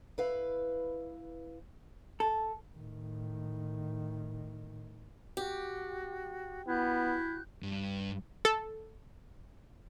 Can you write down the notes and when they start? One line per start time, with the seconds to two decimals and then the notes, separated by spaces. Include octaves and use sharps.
0.18 E4 B4 F5
2.20 A4
2.76 A2 D#3
5.37 F#4 G4
6.67 B3 E4 F#4 F#6 G6
7.63 G2
8.45 A4